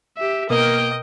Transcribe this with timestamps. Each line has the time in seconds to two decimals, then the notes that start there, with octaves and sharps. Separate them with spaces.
0.17 G4 E5
0.50 B2 A#3 A#4 D#5 G5